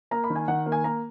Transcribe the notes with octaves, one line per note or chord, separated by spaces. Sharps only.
A#3 A#5
B5
D#3
G#5
D#3 F#5
A#3
G#5
A#3 A#5